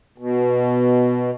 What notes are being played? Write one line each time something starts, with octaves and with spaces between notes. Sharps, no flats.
B2